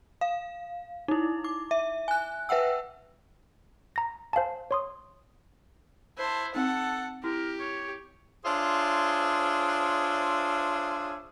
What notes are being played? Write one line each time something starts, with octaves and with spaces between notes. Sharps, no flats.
F5
D#4 E4
D6
E5
G#5 F#6
B4 E5 F#5 G5 E6
A#5 A#6
C5 F5 G#5 A5
C#5 C6 D#6
E4 C5 A5
C4 D#4 A4 F#5 A5
E4 G4 A#4
C#5
D4 F4 G#4 C5 C#5 E5